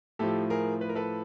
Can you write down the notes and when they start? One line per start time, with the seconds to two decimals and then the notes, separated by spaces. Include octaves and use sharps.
0.19 A2 F3 G4 A4
0.50 G#4 A#4
0.81 B4
0.89 A#4
0.95 A4 B4